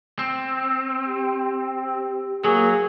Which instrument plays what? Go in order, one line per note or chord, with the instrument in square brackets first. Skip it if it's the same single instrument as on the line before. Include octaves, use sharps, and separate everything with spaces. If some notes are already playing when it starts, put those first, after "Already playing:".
[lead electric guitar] C4
[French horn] G4
[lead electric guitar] F#3 [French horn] A#3 [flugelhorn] G#4